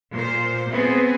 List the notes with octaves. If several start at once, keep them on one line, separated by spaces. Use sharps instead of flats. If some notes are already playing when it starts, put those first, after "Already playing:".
A#2 C5
B3 C4 G#4